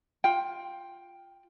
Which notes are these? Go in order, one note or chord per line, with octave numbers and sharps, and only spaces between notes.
F4 G5